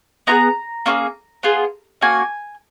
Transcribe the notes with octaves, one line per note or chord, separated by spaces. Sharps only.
B3 F4 G#4 A#5
A#3 C#4 F4 G#4
B3 F4 G#4
A#3 C#4 F#4 G#5